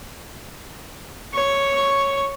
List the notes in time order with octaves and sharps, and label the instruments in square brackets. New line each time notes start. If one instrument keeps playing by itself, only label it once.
[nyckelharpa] C#5 C#6